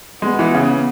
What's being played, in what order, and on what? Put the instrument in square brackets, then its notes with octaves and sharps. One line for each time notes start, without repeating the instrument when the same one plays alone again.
[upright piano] G#3 [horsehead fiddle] B3
[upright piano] E3
C#3